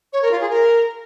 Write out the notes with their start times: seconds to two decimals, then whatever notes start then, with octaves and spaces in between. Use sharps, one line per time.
0.13 C#5
0.22 A#4
0.31 F4
0.41 G#4
0.50 A#4